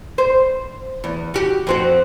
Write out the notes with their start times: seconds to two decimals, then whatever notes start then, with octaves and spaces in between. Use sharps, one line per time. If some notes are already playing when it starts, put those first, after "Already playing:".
0.18 C5
1.04 E2
1.34 F#4 G4
1.67 F2 C4 F#4